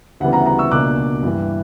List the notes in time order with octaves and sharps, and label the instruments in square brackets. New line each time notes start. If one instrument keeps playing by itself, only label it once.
[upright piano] D2 C#3 E3 G3 B3 F#5
F#5 A#5
F#5 A#5
C#6 E6
C#2 B2 A#3 D4 D6 F#6
G2 E3 G3